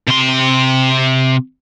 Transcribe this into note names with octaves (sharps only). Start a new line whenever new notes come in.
C3 C6